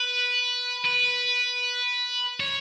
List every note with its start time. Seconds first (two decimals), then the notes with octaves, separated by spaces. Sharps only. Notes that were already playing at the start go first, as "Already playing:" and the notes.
Already playing: B4
0.85 B4
2.40 C#5